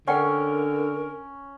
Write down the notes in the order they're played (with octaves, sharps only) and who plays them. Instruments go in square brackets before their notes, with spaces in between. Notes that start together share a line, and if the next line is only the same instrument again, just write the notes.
[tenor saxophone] D3 [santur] C#4 [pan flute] A#4 [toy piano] D5 F#5 G5